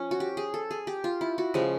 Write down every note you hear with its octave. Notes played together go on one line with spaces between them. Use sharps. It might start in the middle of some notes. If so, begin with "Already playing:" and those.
Already playing: F3 C#4
F#4
G4
G#4
A4
G#4
G4
F4
E4
F#4
C#3 F3 G#3 G4